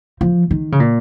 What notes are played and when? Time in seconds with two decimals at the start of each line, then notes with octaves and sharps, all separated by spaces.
0.21 F3
0.51 D#3
0.72 C#3
0.80 A#2